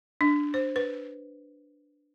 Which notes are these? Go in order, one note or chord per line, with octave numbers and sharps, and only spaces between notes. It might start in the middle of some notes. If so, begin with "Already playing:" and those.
D4
C5
B4